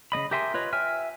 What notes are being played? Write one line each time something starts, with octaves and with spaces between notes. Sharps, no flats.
C#3 A#3 D#5 B5
G4 A#4 E5 G#5 C6
F4 B4 C#5 D#5
E5 G5 G#5 F6